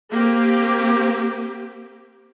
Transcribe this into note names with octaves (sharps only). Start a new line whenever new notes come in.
A#3 C4 G4